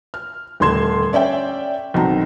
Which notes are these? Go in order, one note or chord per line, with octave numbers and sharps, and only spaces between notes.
F6
D#1 D3 A3 C6 G#6 E7
C#4 D5 E5 G5
B1 D#3 C4 A#5